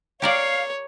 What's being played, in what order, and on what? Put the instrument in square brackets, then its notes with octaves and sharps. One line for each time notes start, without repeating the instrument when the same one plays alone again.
[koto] G4 A#4 D5 [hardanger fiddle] C#5 [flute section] F5